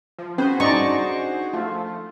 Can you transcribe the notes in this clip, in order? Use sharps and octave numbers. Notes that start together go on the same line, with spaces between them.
F3
C#4 F#4 G#4 B4 C5
D4 D#4 D5 C#6
F3 A3 F4